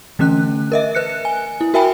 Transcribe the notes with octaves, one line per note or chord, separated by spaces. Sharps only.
D3 E3 A3 C#4 F#6
A#4 D#5 E5
B4 F#6 C#7
G#5
E4
F#4 A#4 E5 G5 G#5 B5